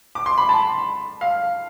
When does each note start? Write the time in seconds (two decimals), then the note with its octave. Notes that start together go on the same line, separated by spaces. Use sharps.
0.15 D6
0.26 C6
0.38 B5
0.49 A5
1.21 F5